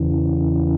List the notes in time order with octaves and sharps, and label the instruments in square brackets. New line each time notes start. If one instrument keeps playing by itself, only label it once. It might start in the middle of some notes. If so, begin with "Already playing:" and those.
Already playing: [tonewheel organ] E2 C#3 E3